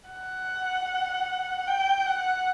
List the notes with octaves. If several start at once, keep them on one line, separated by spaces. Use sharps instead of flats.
F#5
G5
F#5